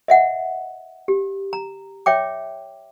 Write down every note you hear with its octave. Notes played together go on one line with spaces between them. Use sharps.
D#5 E5 F#5
G4
A#5
C#5 E5 G5 D6